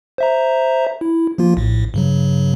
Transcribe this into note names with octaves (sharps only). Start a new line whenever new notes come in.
C5 E5 A#5
E4
F3 A#3 F4
A#1 A2
G2 C#3 F#3